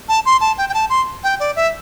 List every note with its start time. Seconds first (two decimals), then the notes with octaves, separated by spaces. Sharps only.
0.08 A5
0.25 C6
0.41 A5
0.58 G5
0.69 G5
0.74 A5
0.90 C6
1.23 G5
1.40 D5
1.56 E5